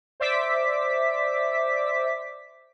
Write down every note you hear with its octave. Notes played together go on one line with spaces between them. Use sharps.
C5 D5 E5 D6 B6